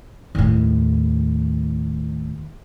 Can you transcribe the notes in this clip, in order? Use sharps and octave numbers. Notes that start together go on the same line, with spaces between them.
D#2 A2